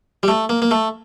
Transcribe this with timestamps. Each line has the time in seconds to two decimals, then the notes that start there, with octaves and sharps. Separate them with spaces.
0.23 G3
0.28 A3
0.49 A#3
0.62 A#3
0.71 A3